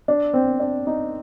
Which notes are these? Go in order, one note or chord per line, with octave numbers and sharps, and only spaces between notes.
D4
C4
D4
D#4